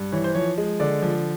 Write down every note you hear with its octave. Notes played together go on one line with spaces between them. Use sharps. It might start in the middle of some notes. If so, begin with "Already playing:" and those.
Already playing: G2
E3 C#5
C5
F3 C#5
G#3
D3 D5
F3